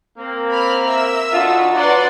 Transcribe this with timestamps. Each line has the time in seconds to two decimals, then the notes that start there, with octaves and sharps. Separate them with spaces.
0.18 A#3 C4
0.51 B5 F6
0.85 A#4 E5 E6
1.32 D3 D4 D#4 F4 F#4
1.75 F#3 D4 F#4 B4 D5 F#5 C6